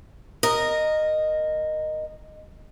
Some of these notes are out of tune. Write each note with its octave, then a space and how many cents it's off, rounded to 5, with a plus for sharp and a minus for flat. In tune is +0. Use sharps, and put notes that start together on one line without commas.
A#4 +0 D#5 -10